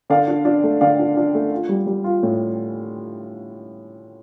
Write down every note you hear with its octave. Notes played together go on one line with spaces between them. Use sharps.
D3 D5 F5
D4
D4
A3
D3 D5 F5
D4
D4
A3
F4
G3
G3
F4
A2